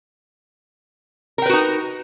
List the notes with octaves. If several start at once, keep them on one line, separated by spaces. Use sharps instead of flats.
D#4 F#4 A#4 B4 G5